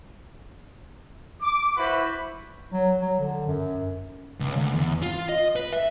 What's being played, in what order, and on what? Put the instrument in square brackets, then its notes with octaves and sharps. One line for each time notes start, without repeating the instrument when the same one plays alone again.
[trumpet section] D6
E4 F#4 B4 C5 B5
[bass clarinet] F#3
F#3
D3
F#2
[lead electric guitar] C#2
D2
E2
F4
D#5
B4
E5